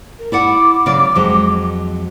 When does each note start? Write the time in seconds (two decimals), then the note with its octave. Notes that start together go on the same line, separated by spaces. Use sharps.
0.18 A#4
0.32 E4 D5 F#5 D6
0.86 C#3 F#3 D5
1.15 F2 F#3 G#3